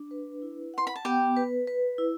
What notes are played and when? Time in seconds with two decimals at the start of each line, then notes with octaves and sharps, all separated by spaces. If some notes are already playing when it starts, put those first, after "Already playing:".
Already playing: D4
0.11 B4
0.42 E4
0.74 F#5 C6
0.87 B5
0.96 A5
1.05 B3 G4 G5
1.37 B4
1.67 B4
1.98 E4